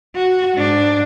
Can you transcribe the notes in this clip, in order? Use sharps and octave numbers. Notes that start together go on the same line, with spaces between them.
F#4
G#2 D4